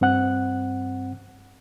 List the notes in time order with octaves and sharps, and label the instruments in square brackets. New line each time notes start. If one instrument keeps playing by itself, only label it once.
[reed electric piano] G2 C4 F#5 F#6